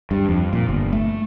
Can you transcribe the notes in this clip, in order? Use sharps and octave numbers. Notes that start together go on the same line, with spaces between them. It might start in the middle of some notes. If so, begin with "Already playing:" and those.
G2
F2
A#2
G1
A3